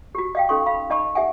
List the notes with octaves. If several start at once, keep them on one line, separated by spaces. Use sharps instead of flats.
F#4 G4
D#5 F5 G5
C#4 D#4 A4 C6 C#6
F5 B5
D#4 D#5 A5 B5 C#6
G4 E5 F#5 G#5